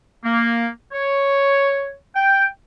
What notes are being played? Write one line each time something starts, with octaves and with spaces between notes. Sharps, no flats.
A#3
C#5
G5